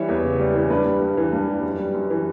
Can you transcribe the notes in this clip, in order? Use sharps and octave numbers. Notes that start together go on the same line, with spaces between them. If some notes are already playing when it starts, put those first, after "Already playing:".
Already playing: E3 G3 C#5 E5
E2
C#3
G3
E3
G2 B4 D5
G3
G2
E3
G2
G3
F#2
G3
F#2
E3